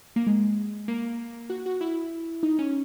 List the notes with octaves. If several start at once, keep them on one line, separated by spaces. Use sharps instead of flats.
A#3
G#3
A#3
F#4
F#4
E4
D#4
C#4